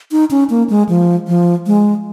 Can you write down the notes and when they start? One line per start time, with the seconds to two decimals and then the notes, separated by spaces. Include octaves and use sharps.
0.12 D#4
0.31 C#4
0.50 A#3
0.70 G#3
0.89 F3
1.27 F3
1.66 G#3